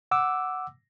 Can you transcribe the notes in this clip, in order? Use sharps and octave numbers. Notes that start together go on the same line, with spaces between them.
F#5 D6 E6